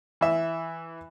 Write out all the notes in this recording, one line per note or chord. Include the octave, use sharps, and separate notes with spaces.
E3 E5